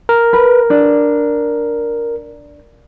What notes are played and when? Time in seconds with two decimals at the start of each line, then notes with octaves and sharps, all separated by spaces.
0.09 A#4
0.33 B4
0.70 D4